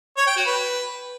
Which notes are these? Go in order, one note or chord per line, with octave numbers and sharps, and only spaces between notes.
C#5
G5
F#4
B4